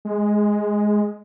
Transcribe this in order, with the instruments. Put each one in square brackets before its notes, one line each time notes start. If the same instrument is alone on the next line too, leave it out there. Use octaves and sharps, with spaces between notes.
[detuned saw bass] G#3